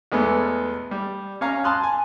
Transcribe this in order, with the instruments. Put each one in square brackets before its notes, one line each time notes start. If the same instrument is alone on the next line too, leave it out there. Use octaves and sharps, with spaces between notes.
[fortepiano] E2 G#3 A3 B3
G3
C#4 C#5 F5 A#5
A5 A#5 C6 D#6 F#6
G#5